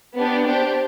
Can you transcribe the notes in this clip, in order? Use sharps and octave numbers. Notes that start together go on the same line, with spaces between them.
B3 D4 G4
D4 G4 C5